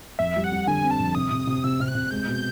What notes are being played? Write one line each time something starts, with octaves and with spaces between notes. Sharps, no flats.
F2 E5
G3
F#5
G3
D3 G#5
C4
A5
F2
C3 D#6
C3
C3
C3 E6
C3 F6
F#6
C3
G#3 G6
B2
G6